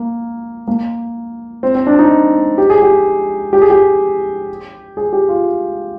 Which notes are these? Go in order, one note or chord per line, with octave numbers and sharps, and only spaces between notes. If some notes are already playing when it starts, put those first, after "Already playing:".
Already playing: A#3
A#3
C4
C4
D4
D#4
G4
G#4
G4
G4
G#4
G4
G#4
G4
F4